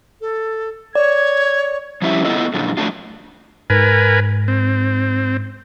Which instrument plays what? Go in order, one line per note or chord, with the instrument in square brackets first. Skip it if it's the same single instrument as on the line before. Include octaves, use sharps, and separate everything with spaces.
[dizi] A4
[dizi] C#5 [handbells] D5 [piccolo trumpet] G#6
[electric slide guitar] F3 G3 C#4 E4 G4 E5
A3 B3 E4 F4 A4 D#5
F#2 A#2 D3 F3
F2 F#3 A3 D4 F4
[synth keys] G#2 [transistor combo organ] A#4 B4 G#5
[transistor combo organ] C4